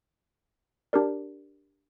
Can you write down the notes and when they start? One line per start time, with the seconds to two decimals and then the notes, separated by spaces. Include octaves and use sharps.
0.93 D4 G4 A#4 D5